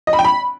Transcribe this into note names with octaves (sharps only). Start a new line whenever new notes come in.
D#5
B5
G5
B5